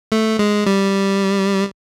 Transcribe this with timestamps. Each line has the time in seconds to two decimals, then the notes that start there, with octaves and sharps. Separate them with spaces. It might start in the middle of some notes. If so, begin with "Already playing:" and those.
0.12 A3
0.39 G#3
0.66 G3